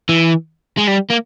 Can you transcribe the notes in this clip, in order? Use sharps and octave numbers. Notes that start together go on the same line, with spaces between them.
E3
G#3
G3
A#3